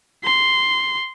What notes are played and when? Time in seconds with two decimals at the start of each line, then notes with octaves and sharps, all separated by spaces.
0.24 C6